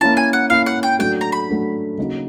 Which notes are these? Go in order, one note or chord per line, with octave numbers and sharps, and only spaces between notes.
A#3 C#4 E4 A5
G#5
F#5
A#3 C#4 E4 F5
F#5
G5
F#3 A3 D4 F#4 G5
A#5
B5
F#3 A3 D4 F#4
C#3 F#3 A#3 D#4